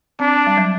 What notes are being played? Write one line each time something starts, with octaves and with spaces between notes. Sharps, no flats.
C4 D4
G3
F#3